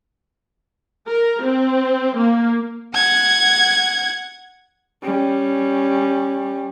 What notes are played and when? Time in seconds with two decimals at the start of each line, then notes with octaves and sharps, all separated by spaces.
1.08 A#4
1.43 C4
2.16 A#3
2.94 F#5 G#6
5.03 G3 C#4